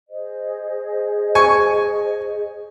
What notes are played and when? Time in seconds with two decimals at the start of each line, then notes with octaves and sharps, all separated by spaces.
0.09 G#4 C5 D#5
1.35 G#5 C#6